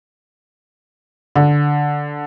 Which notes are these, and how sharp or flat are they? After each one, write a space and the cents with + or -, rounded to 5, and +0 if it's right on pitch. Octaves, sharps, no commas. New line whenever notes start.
D3 +0